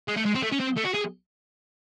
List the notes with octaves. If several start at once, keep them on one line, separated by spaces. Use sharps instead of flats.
G#3
A3
G#3
C4
A3
C#4
C4
A3
F#4
G#4